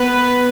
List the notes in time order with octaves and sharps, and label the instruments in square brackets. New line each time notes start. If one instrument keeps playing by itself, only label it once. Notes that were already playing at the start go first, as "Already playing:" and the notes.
Already playing: [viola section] B3 B4